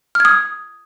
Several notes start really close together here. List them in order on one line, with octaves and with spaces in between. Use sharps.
F6 G#6 D#6